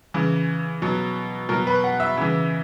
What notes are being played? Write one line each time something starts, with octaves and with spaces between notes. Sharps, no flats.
C#3 E3
B2 F#3
B2 F#3 A#4
B4
F#5
E5
C#3 E3